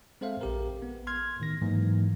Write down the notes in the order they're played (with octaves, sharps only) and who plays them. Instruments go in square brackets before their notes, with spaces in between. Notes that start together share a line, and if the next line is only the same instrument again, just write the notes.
[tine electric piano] G#3 C4 A4 C5 E5 F5
A#1 G4 A#4
B3
C6 F6 G#6
A2 D#3 A#6
G#2 E3 F#3 A#3